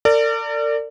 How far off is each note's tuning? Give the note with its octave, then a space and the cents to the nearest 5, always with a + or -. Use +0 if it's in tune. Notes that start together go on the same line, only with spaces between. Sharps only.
A#4 -45 D5 +0